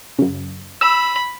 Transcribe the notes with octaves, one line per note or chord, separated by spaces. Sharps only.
F#2 C#3
B5 E6